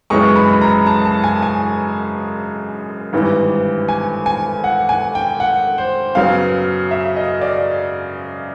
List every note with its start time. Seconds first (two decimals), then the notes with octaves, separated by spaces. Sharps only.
0.10 F#2 C#3 E3 G#3 C#6
0.36 B5
0.50 B5
0.61 A#5
0.86 A5
1.05 A5
1.24 G#5
1.42 G#5
3.13 G#1 G2 E3
3.88 G#5
4.26 G#5
4.64 F#5
4.89 G#5
5.15 G5
5.40 F#5
5.78 C5
6.15 F#2 C#3 F#3 B3 F5
6.91 E5
7.16 D#5
7.41 D5